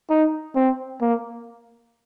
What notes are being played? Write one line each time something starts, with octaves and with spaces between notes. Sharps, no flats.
D#4
C4
A#3